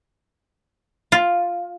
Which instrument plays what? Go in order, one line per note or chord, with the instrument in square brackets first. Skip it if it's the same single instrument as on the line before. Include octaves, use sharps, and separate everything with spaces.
[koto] F4